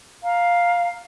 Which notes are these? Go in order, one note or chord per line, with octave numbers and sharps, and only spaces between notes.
F5 A#5